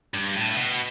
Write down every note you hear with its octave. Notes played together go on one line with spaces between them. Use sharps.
G2
A2
B2